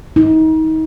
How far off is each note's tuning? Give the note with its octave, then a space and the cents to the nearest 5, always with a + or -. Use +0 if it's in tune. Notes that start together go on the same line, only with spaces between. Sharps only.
D#4 +30